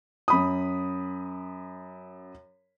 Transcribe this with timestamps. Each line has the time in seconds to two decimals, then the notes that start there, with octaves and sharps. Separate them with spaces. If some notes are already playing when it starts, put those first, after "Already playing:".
0.28 F#2 B5 D#6